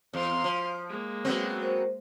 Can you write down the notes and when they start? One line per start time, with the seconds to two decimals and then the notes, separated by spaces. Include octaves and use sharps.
0.13 E2 F5 C6
0.44 F3
0.89 G#3 A#3
1.25 F#3 B3 C4
1.62 A#4 C5